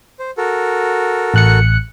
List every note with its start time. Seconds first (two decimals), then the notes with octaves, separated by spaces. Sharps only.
0.19 C5
0.37 F#4 A4 A#4
1.34 A1 F#6 C#7